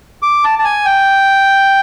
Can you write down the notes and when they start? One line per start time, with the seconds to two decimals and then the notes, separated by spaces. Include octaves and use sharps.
0.22 D6
0.44 A5
0.59 A5
0.64 G#5
0.85 G5